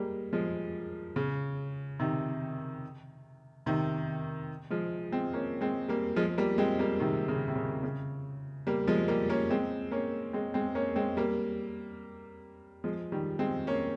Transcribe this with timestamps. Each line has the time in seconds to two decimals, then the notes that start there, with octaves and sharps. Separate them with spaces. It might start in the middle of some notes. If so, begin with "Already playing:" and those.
Already playing: G3 G#3 A#3
0.33 F3 G#3
1.16 C#3
2.00 C3 D#3
3.66 C3 D#3
4.70 F3 G#3
5.12 G#3 C4
5.34 A#3 C#4
5.61 G#3 C4
5.88 G3 A#3
6.16 F3 G#3
6.38 G3 A#3
6.58 G#3 C4
6.79 G3 A#3
7.00 C3 D#3
7.28 C#3
7.48 C3
7.56 C#3
7.83 C#3
8.67 G3 A#3
8.87 F3 G#3
9.08 G3 A#3
9.30 A#3 C#4
9.50 G#3 C4
9.92 A#3 C#4
10.33 G#3 C4
10.54 G#3 C4
10.75 A#3 C#4
10.96 G#3 C4
11.17 G3 A#3
12.84 F3 G#3
13.12 D#3 G3
13.39 G#3 C4
13.67 A#3 C#4